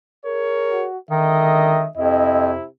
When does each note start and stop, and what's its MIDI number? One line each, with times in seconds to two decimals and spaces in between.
0.24 0.86 68
0.24 0.86 70
0.24 0.86 73
0.70 0.98 66
1.11 1.88 37
1.11 1.88 50
1.11 1.86 51
1.11 1.88 75
1.11 1.89 76
1.97 2.54 41
1.97 2.66 48
1.97 2.66 64
1.97 2.50 75